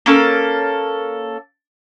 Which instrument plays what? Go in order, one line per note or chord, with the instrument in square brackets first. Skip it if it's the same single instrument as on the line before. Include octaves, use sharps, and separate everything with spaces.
[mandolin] A#3 C#4 A4